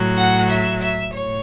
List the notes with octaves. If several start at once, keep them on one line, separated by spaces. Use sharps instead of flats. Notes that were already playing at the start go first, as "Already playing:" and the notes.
Already playing: A2 F#3
F#5
E5
E5
A2 C#5